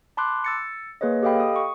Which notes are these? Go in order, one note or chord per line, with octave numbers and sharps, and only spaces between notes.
A5 B5 C6 D6 F#6
E6 A6 C#7
A#3 G#4 B4 C#5 D#5
G4 A4 D#5 F5 G5 B5
D#6
C#6